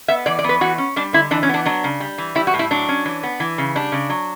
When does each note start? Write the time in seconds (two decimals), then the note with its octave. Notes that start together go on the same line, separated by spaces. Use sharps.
0.08 B3 E5
0.26 E3 D5
0.39 D5
0.44 B3 B4
0.61 E3 F#4
0.78 C#4
0.96 G3 D4
1.13 D3 E4
1.31 E3 D4
1.43 C#4
1.49 B3 D4
1.65 F#3 D4
1.84 C#3
2.00 G3
2.18 E3
2.35 G3 E4
2.47 F#4
2.54 A2
2.59 E4
2.71 F#3 D4
2.89 C#4
3.05 E3
3.23 B3
3.40 E3
3.58 C#3
3.75 G3 D4
3.92 C#3
4.10 F#3